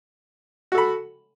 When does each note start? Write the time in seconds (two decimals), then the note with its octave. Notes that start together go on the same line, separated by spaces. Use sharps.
0.72 F#4
0.75 A4
0.78 B5